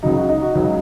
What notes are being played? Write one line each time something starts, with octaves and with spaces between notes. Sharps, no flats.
C#2 C#3 F#3 D#4
F#4
D#4
F#4
C#2 C#3 F#3 D#4